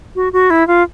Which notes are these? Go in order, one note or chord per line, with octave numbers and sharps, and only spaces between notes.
F#4
F#4
E4
F4